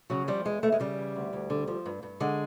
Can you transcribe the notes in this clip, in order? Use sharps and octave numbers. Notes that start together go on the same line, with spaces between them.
C#3 F#3
F3 G3
E2 G#3
E2 A3
G#3
C#3 G3
E3
D2
D2
D3
F3
G2
G2
D3 G#3